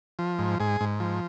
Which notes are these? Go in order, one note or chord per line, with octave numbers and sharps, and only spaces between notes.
F3
G#2
G#2 G#4
G#2
F3